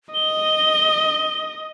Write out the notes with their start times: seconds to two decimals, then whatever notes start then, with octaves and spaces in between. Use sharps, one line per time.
0.14 D#5 G7